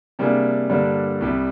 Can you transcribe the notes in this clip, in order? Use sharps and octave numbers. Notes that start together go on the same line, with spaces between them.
C3 G3 A#3 D4 G#4
G2 D3 G3 A#3 D4
C2 C3 G3